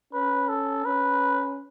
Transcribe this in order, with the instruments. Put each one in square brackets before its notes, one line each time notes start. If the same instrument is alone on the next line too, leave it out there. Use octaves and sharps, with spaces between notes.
[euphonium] C#4 [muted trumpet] B4
[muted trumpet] A4
[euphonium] C#4 [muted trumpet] B4